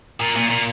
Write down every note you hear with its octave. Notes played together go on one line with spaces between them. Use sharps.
A#2
A#2
A#2